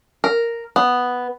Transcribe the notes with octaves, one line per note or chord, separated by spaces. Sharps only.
A#4
B3